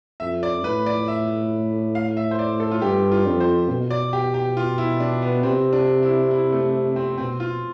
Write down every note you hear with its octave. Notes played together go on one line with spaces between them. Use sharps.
F2 E5
D5
A2 B4
D5
E5
F5
E5
C5
D5
A4
F4
G2 G4
F4
F2
C5
B2
D5
G4
G4
F4
E4
D4
B3
C3 C4
D4
E4
E4
A3
C4
B2 C4
F4